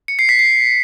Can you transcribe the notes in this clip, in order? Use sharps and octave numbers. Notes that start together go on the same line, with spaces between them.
C#7
C7
B6
C7